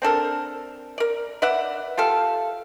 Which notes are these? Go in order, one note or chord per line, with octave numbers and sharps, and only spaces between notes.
C4 D4 A4 A#4
A#4 D5
B4 D5 E5 F#5
F4 G4 A4 F5